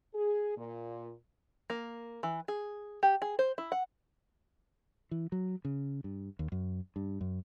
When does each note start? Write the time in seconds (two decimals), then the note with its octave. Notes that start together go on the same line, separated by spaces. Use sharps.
0.14 G#4
0.56 A#2
1.70 A#3
2.23 E3
2.48 G#4
3.03 G4
3.22 G#4
3.39 C5
3.58 E4
3.72 F#5
5.11 E3
5.32 F#3
5.65 C#3
6.04 G2
6.39 D#2
6.52 F#2
6.96 G2
7.21 F#2